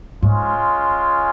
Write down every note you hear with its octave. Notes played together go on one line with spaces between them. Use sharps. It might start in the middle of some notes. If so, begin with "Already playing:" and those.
G#2 G#3 C#4 F4